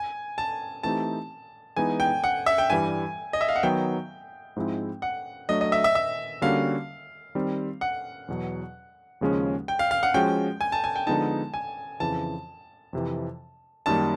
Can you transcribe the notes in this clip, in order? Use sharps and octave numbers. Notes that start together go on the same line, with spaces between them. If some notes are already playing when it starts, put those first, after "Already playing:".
Already playing: G#5
A5
E3 A3 C4 D#4 G4 A5
E3 G#3 B3 D#4 G#5
G5
F#5
E5
G5
G2 E3 G3 G#5
D#5
E5
F5
F#5
D#3 F#3 B3 D#4 G5
G#2 F3 G#3 C4 E4
F#5
F#3 A3 D4 D#5
D#5
E5
E5
E5
D3 G3 A#3 C#4 F#4 F5
D#3 G3 C4
F#5
E2 B2 F#3
D#2 C#3 F3 G#3 C#4
G5
F5
F5
F#5
F3 G#3 C#4 F#4 G5
G#5
A5
G#5
G5
D3 F3 G#3 B3 D#4 A5
G#5
F2 C#3 E3 A5
F2 C3 E3
F#2 D#3 G3 A#3 A5